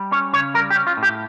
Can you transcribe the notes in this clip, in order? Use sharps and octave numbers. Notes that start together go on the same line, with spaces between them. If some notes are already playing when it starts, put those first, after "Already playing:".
Already playing: G3
C#4 C#5
C#3 C#5
G3 A#4
G4
C#4
F4
A2
G4